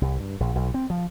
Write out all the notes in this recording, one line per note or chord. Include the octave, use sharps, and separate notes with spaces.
C2
G2
A#1
B1
C4
F3